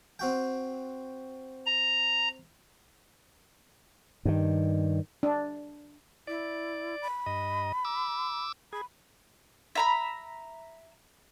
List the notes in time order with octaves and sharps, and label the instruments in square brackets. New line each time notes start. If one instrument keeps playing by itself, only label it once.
[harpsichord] C4 F#4 G5
[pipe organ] A#5
[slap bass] G2 D#3
[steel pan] D4
[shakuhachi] E4 [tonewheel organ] D5
[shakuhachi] B5
[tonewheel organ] G2 D#5
D6 E6
[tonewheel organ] G#4 [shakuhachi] B5
[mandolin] E5 A#5 B5